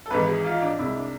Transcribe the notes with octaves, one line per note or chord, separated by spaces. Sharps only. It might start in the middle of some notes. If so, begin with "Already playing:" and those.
A4
G#1 G#2 E3 G#3 B4
G#4
F4
D4
C2 C3 G#3 E4
D4